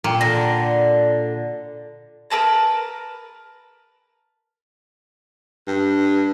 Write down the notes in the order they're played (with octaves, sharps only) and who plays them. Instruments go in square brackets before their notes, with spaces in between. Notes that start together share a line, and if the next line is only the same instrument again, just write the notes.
[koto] A#2 [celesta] G5 A#5
[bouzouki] D3 [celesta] A#6
[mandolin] A#4 B4 A5 A#5
[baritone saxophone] G2